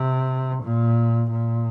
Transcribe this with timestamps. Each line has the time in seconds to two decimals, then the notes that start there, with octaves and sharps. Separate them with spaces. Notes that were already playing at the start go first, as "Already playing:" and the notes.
Already playing: C3
0.63 A#2
1.31 A#2